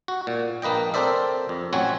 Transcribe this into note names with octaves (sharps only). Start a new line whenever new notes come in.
F#4
A#2
A#1 A#3 B4 D#5 G5
C4 A4 A#4 C5 D5 E5
F2
A1 F#3 C4 F#4 G#5